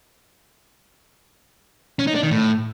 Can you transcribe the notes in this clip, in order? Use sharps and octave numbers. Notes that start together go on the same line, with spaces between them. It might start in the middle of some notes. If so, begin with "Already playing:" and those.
C#4
D#4
D4
D#3
A2